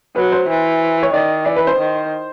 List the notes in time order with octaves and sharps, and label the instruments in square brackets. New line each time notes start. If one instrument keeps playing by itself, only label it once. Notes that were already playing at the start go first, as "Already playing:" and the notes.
[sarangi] F#3 [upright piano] B4
[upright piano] C5
[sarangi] E3
[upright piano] C#5
[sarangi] D#3 [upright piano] D5
[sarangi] E3 [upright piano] D5
[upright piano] B4
C5
[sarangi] D#3